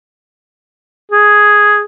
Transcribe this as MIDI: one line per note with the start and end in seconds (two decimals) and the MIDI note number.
1.12 1.83 68